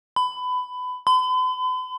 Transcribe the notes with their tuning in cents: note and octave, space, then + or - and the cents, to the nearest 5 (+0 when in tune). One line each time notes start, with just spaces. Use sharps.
B5 +20
B5 +45